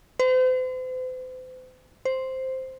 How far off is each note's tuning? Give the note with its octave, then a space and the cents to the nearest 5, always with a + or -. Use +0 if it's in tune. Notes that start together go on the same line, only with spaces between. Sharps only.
C5 -40
C5 +0